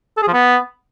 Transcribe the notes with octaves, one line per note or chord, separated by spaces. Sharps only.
A4
G#4
F3
B3